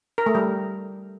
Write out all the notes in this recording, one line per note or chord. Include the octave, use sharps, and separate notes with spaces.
A#4
A3
G3